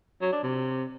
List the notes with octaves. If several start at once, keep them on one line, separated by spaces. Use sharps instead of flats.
F#3
D4
C3